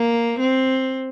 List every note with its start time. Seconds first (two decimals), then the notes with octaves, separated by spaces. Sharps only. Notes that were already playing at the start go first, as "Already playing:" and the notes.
Already playing: A#3
0.40 C4